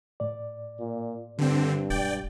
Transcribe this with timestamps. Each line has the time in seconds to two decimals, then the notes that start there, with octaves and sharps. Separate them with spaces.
0.20 A2 D5
0.79 A#2
1.38 G2 D3 C4
1.90 E1 D5 G5